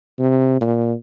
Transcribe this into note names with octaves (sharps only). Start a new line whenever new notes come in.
C3
A#2